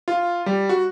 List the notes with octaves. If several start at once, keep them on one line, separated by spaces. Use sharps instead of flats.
F4
G3
F#4